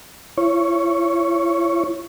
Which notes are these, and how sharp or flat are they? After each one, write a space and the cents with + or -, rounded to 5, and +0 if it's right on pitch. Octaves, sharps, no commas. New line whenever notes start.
E4 +40 C#5 +0